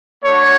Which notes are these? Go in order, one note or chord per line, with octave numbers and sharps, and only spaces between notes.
A3 D4 F#4 C#5